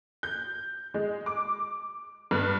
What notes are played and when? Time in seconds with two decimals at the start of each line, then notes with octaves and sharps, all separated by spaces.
0.23 G6
0.94 G#3
1.26 D6
2.31 G2